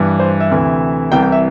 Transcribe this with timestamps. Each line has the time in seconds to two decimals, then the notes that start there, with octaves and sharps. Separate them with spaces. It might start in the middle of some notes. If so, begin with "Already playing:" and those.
Already playing: G2 E3
0.20 C5
0.40 E5
0.51 D2 C3 E3
1.12 C2 C3 E3 G5
1.23 G5
1.32 E5